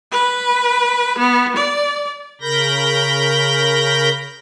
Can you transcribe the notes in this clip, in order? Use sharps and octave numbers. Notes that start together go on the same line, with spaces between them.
B4
B3
D5
C#3 A#4 B5 G6 A#6